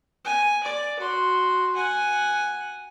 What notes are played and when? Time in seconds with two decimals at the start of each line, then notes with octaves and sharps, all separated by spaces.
0.25 G#5
0.64 D5
0.99 F#4 C6
1.75 F#5 G#5